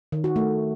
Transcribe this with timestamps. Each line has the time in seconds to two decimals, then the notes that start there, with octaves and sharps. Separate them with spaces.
0.12 D#3
0.24 F#4
0.36 A3